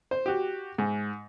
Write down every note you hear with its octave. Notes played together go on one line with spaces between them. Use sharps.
C5
F#4 G4
G#2